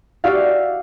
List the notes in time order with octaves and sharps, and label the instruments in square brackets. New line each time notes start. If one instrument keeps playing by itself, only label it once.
[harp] F#4 G4 D5 E5 F5